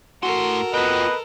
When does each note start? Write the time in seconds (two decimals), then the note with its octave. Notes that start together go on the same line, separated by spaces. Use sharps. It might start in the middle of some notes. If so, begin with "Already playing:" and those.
0.23 A2 F#4 A4 A#4 C6
0.74 F4 B4 D#5 G5